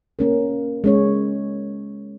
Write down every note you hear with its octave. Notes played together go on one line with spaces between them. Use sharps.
A#3 C#4 A#4
G#3 C#4 C#5